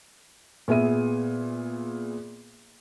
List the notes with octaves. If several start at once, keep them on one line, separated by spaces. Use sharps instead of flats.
A#2 B3 G#4 E5 D#7